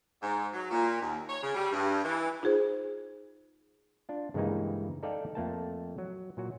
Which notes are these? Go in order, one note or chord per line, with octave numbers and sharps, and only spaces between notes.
G#2
F#3
A#2
D#2
C#5
C#3
G3
G2
E3
D#4 F4 G#4 C5
D4 F4
G2 C#3 E3 G#3 A#3 D#4
D#4 A4 D5 F5 G5
F2 A3 A#3 G5 A5
F#3
A#2 F#3 F#4